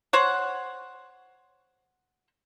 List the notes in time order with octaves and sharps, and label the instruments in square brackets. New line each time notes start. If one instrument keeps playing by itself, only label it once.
[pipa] C5 C#5 F#5